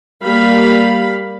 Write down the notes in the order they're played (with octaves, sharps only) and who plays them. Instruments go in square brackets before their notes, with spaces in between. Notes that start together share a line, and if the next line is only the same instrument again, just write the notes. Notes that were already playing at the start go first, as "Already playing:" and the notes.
[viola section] G3 A#3 F5 B5